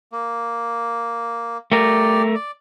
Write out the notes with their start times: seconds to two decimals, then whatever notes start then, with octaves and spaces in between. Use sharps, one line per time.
0.12 A#3
1.72 A3 G4 A#4 D5
2.35 D5